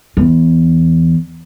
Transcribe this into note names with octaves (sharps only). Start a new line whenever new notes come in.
E2